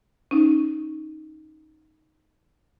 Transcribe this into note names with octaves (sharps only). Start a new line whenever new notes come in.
C#4 D#4